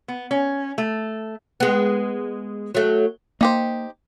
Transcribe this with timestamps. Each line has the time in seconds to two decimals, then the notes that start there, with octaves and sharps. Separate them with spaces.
0.08 B3
0.31 C#4
0.78 A3
1.60 G#3 B3
2.75 F#3 A3
3.41 A#3 D#4 G4 C5